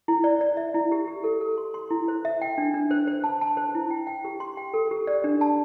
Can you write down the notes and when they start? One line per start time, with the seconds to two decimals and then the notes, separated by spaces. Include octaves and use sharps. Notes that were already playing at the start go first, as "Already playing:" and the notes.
0.08 E4
0.24 D5
0.41 D5
0.57 E5
0.74 E4
0.92 G4
1.08 G4
1.24 A4
1.41 A4
1.58 C6
1.74 C6
1.91 E4
2.08 C5
2.25 E5
2.42 G5
2.58 D4
2.74 D4
2.91 C5
3.07 C5
3.24 A5
3.41 A5
3.57 C5
3.75 E4
3.90 G5
4.07 G5
4.25 G4
4.40 C6
4.57 G5
4.74 A4
4.91 G4
5.07 D5
5.24 D4
5.41 A5